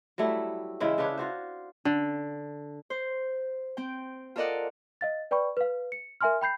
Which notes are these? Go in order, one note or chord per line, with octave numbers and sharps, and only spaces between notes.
F#3 G3 A3 E4
C#3 E3 G#3 E4
C#3 D4 B4 C#5
F4 F#4 C5
D3
C5
C4 G5
F4 A4 A#4 D5 D#5 F#5
D#5 F5 A6
B4 D5 G5 B5 C#6
B4 F5
C#7
A#4 E5 G#5 C6 F6
G5 B5 G6 C7